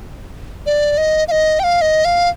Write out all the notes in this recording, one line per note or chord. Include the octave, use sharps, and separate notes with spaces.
D5
D#5
F5
D#5
G5
F5
D#5
F5